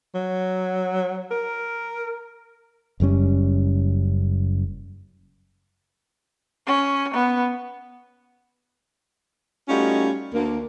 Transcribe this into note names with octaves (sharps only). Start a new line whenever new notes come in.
F#3
A#4
F#1 F#2 G3 C#4
C#4
B3
G3 A3 C#4 D#4 F4 F#4
D2 A#3